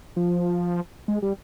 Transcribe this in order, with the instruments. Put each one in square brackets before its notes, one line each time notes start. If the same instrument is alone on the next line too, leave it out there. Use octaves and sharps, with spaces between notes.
[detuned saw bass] F3
G#3
G3